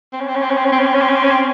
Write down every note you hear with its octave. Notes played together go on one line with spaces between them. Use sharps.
C4
C#4
C4
C#4
C4
C#4
C4
C#4
C4
C#4
C4
C#4
C4
C#4
C4
C#4
C4